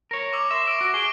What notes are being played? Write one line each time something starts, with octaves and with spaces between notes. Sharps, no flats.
A#4 C#5
C#6 D6 E6
E5 C6
C#6 E6 A#6 D7
F#4
G#4 C#6 D6 D7 G7